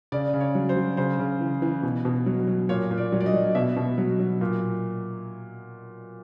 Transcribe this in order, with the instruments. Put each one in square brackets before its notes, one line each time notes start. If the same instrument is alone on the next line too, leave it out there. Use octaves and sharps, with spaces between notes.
[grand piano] C#3 D5
C#3
C#5
F#3
C5
F#3
C#3 C5
C#3
E3
E3
B2
B2
F#3
F#3
A#2 C#5
A#2
D5
F#3
D5
D#5
F#3
B2 E5
B2
F#3
F#3
A#2